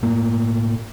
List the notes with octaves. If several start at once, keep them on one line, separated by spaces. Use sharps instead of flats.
A2 A#3